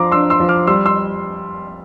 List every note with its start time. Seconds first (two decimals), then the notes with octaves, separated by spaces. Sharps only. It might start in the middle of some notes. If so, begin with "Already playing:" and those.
Already playing: F3 D4 A#5 C6 D6
0.12 D4 C6 E6
0.30 C6 E6
0.40 F3
0.49 D6 F6
0.67 G3 C6 E6
0.86 C6 E6